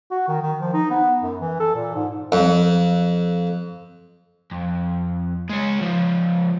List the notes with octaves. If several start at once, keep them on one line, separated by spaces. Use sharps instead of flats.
F#4
D#3
D#3
F3
D#4
B3
F#2
E3
A4
A#2
G#2
F2
F2
G#3 C#5
C#2 F3